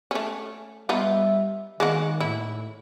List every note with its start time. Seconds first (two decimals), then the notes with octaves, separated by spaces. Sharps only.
0.11 A3 C#4
0.89 G3 B3 D#4 F4 E5
1.80 D#3 G#3 A#3 F#4
2.20 A2 E4